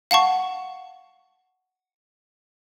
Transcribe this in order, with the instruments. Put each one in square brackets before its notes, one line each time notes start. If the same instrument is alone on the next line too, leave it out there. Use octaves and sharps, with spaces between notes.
[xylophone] F5 F#5 A5 C#6